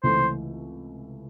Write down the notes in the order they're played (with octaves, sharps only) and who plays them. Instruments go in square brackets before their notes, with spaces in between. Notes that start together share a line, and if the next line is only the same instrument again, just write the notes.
[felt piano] C#2 C3 E3 A3 [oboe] C5